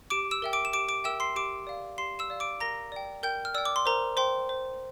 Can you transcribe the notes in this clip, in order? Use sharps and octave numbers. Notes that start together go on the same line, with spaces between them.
G4 D6 D7
E6 E7
A#4 E5 G5
D6 D7
E7
G4 D6 D7
D6 D7
A#4 E5 G5 E6 E7
C6 C7
G4 D6 D7
D5 F5
G4 C6 C7
E6 E7
D5 F5
D6 D7
A#4 A#5 A#6
D5 G5
A#4 G5 G6
F6
D5 G5 E6
D6
C6
A#4 C5 A#5
C5 G5 C6
C5